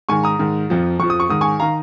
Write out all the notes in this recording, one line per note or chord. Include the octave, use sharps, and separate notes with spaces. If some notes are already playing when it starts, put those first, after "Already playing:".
G#2 D#3 G#5 C#6
A#5 D#6
G#2 D#3
F2 F3
F2 F3 C#6
D#6
C#6
G#2 D#3 D#6
G#5 C#6
D#3 F5 A#5